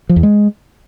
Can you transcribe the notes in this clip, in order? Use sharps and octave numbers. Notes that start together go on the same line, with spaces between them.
F3
E2
G#3